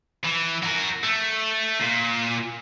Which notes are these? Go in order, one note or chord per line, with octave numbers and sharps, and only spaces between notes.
E3
F#4 A#4
A3
A#2